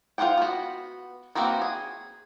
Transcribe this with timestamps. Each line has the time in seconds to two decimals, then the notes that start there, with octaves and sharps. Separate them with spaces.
0.18 F4 G#4 C5 F#5 G5
0.37 B3 F#4
1.35 A#3 C4 D#4 F#4 B4
1.62 G#4